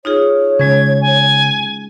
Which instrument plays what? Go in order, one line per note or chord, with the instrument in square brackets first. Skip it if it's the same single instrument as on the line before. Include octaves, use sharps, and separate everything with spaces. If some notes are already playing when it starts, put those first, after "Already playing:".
[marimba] D#4 F4 G#4 [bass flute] C#5
[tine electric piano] C#3 [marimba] G#3 C#4 [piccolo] G#6
[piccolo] G#5